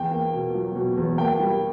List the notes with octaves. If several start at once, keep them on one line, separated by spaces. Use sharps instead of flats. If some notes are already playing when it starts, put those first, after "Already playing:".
Already playing: E2 G5
A#3
B2
F#3
B2
E2
A#3 G5
G3